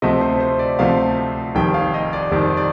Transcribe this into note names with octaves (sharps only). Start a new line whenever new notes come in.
D2 C3 F3 A3 D#5
C5
C5
D5
D2 C3 F3 A3 F5
F1 F2 D#3 G3 G5
F5
D#5
D5
F1 F2 D#3 G3
D5